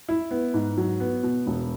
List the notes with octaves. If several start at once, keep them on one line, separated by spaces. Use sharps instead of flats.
E4
B3
G#2
F#3
B3
B2
E1